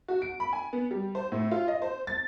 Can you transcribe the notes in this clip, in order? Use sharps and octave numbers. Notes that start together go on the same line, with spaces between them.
F#4
D7
B5
G#5
B3
G3
C5
A2
F4
D#5
C5
A6